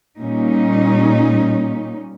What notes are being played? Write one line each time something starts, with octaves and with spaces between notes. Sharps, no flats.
A#2 G3 C#4 D#4